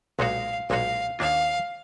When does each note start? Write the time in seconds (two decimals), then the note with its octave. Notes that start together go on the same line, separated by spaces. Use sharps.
0.19 B1 A#2 G#3 D#4 F#4 F5
0.69 B1 A#2 G#3 D#4 F#4 F5
1.19 D#2 D#3 A#3 D4 F4 F5